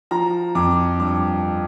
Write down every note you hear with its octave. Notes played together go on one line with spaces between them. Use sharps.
F3 A#5
F2 D6
G2 D6